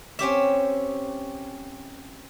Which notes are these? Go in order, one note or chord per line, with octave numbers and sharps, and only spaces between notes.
C4 C#4 G4 E5